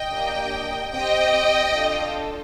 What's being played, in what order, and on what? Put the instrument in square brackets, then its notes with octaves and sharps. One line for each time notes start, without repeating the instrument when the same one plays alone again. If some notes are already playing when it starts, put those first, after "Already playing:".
Already playing: [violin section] D#5 G5
A#3 D4 G4
C4 G4 D#5 G5
D4 F4 A4